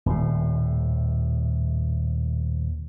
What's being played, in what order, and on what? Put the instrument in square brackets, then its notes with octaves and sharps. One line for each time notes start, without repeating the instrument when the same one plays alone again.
[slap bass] D#1 A2